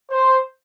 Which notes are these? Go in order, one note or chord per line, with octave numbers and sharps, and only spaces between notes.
C5